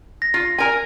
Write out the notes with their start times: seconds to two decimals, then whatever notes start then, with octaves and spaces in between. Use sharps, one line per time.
0.22 A#6
0.34 F4
0.58 A#4 G#5